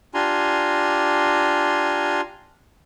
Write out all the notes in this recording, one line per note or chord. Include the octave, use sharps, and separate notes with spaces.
D4 F4 G4 G#5 A#5 C6